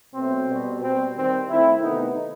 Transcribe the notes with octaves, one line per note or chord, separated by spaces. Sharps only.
B2 F#3 A3 C4
B2 G3
B2 G3 C4
D#3 G3 C4
D#3 A3 C4 E4
C3 D#3 A3 B3 D#4